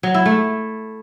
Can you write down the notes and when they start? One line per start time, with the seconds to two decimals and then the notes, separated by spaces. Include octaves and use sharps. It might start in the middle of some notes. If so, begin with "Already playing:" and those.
0.03 F#3
0.14 E4
0.26 A3